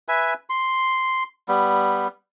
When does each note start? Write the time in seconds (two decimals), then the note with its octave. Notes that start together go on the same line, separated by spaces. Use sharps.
0.08 B4 E5 G#5
0.50 C6
1.48 G3 B3